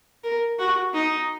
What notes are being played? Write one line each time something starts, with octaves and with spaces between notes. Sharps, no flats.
A#4
F#4
D#4